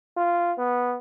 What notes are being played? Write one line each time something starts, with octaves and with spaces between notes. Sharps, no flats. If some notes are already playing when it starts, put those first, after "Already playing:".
F4
B3